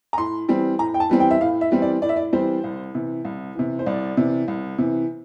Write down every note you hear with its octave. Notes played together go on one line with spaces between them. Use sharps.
A#5
A2 C6
E3 G3 C4
A2 A#5
G5
A5
E3 G3 C4
G5
E5
A2 F5
E5
E3 G3 C4
D5
A2 D5
E5
D5
E3 G3 C4 C5
C2
C3 E3
C2
C3 E3
C5
C2 D5
C3 E3
C2
C3 E3